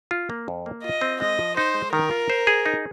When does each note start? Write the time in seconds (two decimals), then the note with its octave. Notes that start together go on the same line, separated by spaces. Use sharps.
0.11 F4
0.30 A#3
0.48 F2
0.66 A#3
0.83 F4 D#5
1.01 C4
1.20 G#3 D#5
1.39 F3
1.57 D#4 C5
1.74 G#3
1.93 D#3 A#4
2.11 F4
2.30 C5
2.47 G#4
2.66 D#4